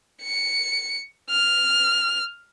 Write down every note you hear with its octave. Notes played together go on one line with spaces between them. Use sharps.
C#7
F6